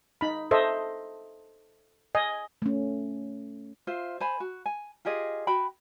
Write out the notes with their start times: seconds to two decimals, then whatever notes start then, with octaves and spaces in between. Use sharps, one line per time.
0.21 D#4 B5
0.51 A4 C5 D#5 E5
2.15 D#5 G#5
2.62 A3 C#4
3.87 F4 C5 E5
4.20 C5 G#5 B5
4.40 F#4
4.66 G#5
5.05 F4 G4 G#4 D#5
5.47 F#4 G5 B5